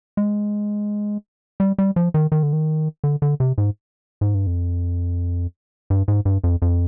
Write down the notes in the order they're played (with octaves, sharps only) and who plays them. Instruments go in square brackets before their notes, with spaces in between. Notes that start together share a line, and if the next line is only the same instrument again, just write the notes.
[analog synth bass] G#3
G3
G3
F3
D#3
D#3
D3
D#3
D3
D3
C3
G#2
G#2
G2
F2
G2
G#2
G2
F2
F2